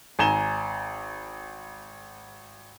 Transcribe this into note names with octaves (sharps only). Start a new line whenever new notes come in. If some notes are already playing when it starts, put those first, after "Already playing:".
G#1 G#5 A#5 E7 G7